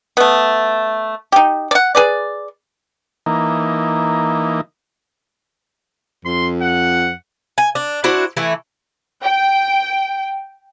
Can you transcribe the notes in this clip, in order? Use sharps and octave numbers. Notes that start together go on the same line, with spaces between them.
A3 B3
D#4 G4
D5 F#5
G#4 B4 D5
E3 A#3 D#4
F2 C6
F#5
G#5
D4
D4 E4 F#4 C5
E3 A3 E4
G5